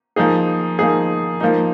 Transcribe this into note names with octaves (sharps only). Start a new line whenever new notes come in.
F3 A#3 D#4 G#4
F3 A#3 D#4 G#4
F3 A#3 D#4